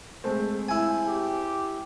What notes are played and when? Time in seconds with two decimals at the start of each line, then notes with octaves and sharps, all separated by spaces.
0.24 G#3 A3 C4
0.69 E4 G#5
1.07 G4